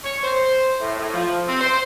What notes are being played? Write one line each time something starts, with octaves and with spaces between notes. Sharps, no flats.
C#5
C5
A2
A2
F3
C4
C5